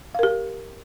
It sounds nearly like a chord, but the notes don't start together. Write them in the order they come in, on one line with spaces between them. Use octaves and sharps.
F5 A#4 G4